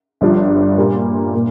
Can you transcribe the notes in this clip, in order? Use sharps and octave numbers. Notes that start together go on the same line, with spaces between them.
G1 G2 F3 D4
A#2 G3 A#3
A#2